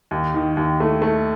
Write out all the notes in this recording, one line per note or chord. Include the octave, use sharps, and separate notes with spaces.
D#2
D#3
D#2
A3
A3